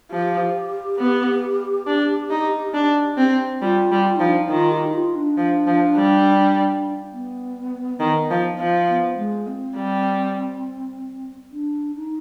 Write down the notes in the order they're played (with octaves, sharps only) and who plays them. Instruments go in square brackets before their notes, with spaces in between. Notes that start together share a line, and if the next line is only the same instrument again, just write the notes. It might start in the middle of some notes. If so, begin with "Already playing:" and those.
[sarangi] F3 [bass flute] G4
[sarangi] B3
D4
D#4
D4
C4
[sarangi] G3 [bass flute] F4
[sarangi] G3
[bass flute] F4
[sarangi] F3 [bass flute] D#4
[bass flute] D4
D#4
[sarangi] D#3 [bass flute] F4
[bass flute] G4
D#4
F4
D4
[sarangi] F3
F3
G3
[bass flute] B3
[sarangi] D#3
F3
F3
[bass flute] B3
G#3
C4
[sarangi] G3
[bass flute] D4
D#4